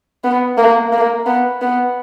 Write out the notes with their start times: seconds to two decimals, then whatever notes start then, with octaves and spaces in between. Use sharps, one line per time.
0.24 B3
0.58 A#3
0.92 A#3
1.26 B3
1.62 B3